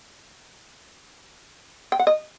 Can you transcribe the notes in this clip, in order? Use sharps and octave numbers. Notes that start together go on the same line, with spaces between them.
G5
F#5
D#5